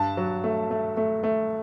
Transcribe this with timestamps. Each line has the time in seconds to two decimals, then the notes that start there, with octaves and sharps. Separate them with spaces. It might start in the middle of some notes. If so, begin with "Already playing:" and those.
Already playing: G2 A5
0.17 F#3
0.44 A3
0.71 A3
0.97 A3
1.24 A3